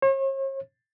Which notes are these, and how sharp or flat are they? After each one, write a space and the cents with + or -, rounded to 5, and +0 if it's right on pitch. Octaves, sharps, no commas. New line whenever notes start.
C#5 -45